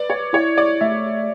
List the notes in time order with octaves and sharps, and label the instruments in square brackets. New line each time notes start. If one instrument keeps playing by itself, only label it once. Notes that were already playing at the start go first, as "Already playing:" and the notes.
Already playing: [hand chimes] B4 [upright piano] D5
[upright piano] C#5
[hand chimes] E4 [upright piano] C#5
[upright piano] D5
[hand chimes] A3 [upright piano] E5